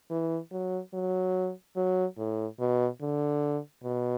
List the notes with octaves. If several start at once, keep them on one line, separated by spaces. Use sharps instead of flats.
E3
F#3
F#3
F#3
A2
B2
D3
B2